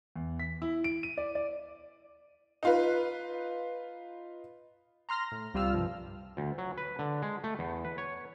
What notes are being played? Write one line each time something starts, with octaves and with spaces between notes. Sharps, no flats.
E2
B6
E4
D7
D#7
D5
D5
D#4 F4 B4
A#5 C6 F6 A#6
A2
C2 G3 F4 E6 F6
G2 C3 F3
D2
F#3
B4
D3
G#3
A3
E2
B4
C#5